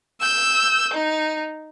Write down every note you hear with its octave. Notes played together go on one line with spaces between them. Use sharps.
E6 G6
D#4